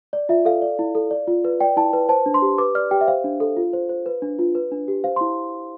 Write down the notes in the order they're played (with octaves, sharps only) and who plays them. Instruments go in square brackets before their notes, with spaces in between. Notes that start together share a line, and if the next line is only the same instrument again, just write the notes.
[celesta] D5
F4 E5
A4 F5
D5
E4
A4
D5
F4
B4
D5 G5
E4 A5
B4
C5 A5
D4
C6
G4
B4 D6
D5 F6
G4 G5
E5
C5 F5
D4
A4
F4
C5
C5
B4
D4
F4
B4
D4
G4
C5 F5
E4 C6